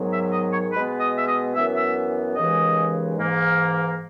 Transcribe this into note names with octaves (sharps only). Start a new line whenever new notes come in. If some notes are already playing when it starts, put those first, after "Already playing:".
Already playing: G#2 D#3 F#3 B3
E5
D#5
C#5
B2 G#3 B3 B4
D#5
E5
D#5
F#2 E3 B3 E5
E5
D#2 C#3 E3 G#3 D#5
G#2 E3 A#3